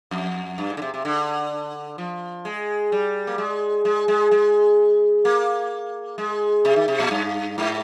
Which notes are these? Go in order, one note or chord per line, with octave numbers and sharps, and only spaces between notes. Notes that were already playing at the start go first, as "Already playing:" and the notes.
F2
G2
G#2
D3
C3
C3
D3
F3
G#3
G3
A#3
G#3
G#3
G#3
G#3
A#3
G#3
C3
D#3
C3
A#2
G2
G#2